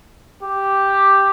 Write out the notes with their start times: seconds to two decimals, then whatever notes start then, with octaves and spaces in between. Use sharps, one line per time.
0.43 G4